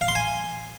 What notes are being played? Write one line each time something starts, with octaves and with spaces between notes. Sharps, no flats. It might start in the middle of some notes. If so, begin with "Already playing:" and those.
F5
C6
G#5